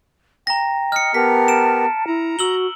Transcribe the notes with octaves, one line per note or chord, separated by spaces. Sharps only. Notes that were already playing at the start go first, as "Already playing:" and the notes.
G5 A#5 A#6
D#5 F6 C#7
B3 G4 A#4 A5 B6
D7 E7
E4 A#5
F#4 E6 F#7 G7